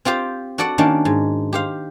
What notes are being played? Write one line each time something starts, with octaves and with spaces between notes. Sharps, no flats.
C4 F4 G4 C5
F#4 A4 D5 F#5
D#3 A#3 C#4 D4
G#2
G4 C5 F5